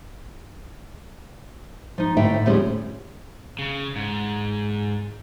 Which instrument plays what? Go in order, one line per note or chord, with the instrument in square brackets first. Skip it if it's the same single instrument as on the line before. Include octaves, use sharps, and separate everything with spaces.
[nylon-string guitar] F3 D#4
D2 A2 D3 D#4 E5 G5
D2 A2 F3 G3 C#4 G#4
[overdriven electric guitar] C#3
G#2